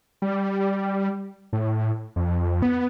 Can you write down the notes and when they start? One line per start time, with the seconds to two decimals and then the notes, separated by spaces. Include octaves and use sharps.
0.22 G3
1.53 A2
2.16 F2
2.62 B3